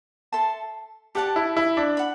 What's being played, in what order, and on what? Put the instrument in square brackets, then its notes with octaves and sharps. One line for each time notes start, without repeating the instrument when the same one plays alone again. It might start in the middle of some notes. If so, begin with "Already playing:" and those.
[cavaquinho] A4 E5 A5 C6
[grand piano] G4 [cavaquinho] A4 D5 F#5 A5
[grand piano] E4
E4
D4
[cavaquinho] F#5 B5